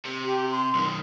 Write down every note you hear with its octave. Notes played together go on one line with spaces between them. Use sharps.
C3
G4
C6
B1 D#3